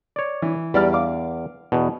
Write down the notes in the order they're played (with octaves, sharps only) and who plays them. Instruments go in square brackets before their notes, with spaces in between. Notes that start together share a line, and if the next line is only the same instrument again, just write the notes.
[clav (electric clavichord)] C#5 D5
[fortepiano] E3
[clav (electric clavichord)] E2 [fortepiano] G3 D5 F6
[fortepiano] F5 D6
[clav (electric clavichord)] E2 B2